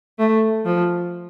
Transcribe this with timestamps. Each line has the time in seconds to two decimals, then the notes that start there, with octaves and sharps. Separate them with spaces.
0.19 A3
0.66 F3